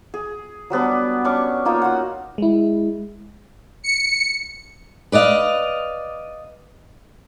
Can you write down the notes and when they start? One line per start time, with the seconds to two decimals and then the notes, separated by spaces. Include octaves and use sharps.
0.14 G#4
0.70 F#3 G3 B3 D4
1.24 C#4 D4 C#6 D6
1.65 A#3 D#4 F4 C#5
1.82 F#4 F#5
2.38 G#3 E4
3.83 C#7
5.12 B4 D5 D#5 F5